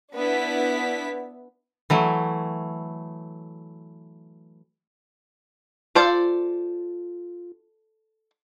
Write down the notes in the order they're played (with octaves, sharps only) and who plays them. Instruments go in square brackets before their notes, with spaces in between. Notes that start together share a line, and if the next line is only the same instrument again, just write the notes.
[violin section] B3 D4 E4 B6
[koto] E3 F#3 A3
[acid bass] F4 [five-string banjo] A4 C5 D5